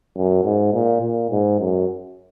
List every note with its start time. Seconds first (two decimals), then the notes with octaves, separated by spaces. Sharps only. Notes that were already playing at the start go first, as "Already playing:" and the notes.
0.16 F#2
0.45 G#2
0.74 A#2
1.02 A#2
1.31 G#2
1.60 F#2